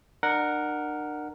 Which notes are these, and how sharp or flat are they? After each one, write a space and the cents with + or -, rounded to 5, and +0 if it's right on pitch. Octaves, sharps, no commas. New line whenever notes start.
D4 +40 A#4 +0 F#5 +0